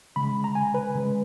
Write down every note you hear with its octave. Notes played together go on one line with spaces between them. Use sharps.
C#3 G#3 B5
A#5
G#5
B4
C#3 G#3